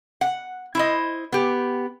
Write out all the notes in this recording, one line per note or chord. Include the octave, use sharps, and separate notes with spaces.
F#5
E4 C5 D#5
B3 G4